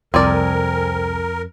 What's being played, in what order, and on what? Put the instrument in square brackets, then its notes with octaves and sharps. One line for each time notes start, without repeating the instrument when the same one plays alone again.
[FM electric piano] C2 A4 G#5 [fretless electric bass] F2 [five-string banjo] C4 D5 [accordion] A#4